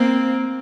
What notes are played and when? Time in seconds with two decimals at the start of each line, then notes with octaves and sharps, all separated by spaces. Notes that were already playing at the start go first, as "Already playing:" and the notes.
Already playing: A#3 C4